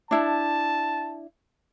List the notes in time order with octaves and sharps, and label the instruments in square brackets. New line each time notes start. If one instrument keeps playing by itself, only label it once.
[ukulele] D4 E4 [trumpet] A5